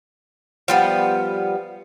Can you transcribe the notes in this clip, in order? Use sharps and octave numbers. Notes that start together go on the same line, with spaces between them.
F3 G3 B3